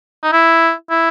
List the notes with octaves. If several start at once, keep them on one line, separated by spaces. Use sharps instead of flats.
D#4
E4
E4